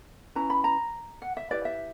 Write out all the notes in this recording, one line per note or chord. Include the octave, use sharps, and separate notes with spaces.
C#4 E4 B4 A#5
B5
A#5
F#5
E5
E4 G4 B4 D5
E5